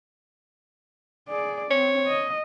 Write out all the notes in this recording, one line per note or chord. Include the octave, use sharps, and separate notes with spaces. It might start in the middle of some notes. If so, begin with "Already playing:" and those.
G#4 D5
C4 C#5
D#5